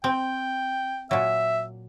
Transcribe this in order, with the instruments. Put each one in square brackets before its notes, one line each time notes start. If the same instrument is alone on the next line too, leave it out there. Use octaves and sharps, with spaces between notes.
[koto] C4 [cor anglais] G5
[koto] A#2 F#3 [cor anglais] E5